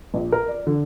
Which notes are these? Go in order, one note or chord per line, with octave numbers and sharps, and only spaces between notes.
A#1
A#4
D5
D3